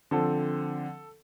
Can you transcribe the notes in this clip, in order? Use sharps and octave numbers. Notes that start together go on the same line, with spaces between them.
D3 F3 C4 A4